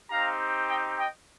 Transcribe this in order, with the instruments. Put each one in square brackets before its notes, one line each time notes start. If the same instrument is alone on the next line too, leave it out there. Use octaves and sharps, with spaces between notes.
[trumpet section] C4 D#4 G4 F5 A#5
D#5 G5
D#5 G5